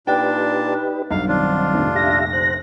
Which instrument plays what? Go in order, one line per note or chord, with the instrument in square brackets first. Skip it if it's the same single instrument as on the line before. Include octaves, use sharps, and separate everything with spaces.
[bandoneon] A#2 D4 A5 [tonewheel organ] D#4 G4 B4 [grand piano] G5
[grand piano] B1 G2 [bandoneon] F5
[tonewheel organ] D#3 C4 [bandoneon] D4 F4
[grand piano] F1 A#1
[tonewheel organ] G4 E5 F5 [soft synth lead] A#6
[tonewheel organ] C5 F#6